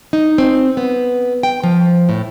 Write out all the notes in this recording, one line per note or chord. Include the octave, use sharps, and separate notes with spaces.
D#4
C4
B3
G5
F3
A2